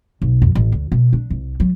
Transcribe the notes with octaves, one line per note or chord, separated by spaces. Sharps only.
B1
F2
A1
D2
B2
D4
C2
F#3